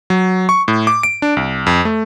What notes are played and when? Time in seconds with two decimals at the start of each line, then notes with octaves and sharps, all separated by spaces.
0.10 F#3
0.49 C#6
0.68 A2
0.87 D6
1.03 D7
1.22 D4
1.37 C2
1.66 F2
1.85 A3